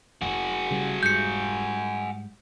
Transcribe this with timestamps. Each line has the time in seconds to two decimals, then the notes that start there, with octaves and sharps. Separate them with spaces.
0.22 F1 F#4 G#4
0.71 C#3 G3
1.03 G#2 G3 G6 C#7